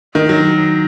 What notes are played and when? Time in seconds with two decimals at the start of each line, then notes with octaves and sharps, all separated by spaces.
0.15 D#3
0.29 F#3